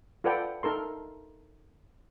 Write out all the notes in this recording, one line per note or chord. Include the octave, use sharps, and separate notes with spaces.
F4 A4 B4 D5 F#5 G5
D#4 A4 A#4 C6